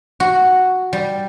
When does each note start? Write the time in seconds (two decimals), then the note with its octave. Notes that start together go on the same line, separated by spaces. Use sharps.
0.20 F#4
0.93 G3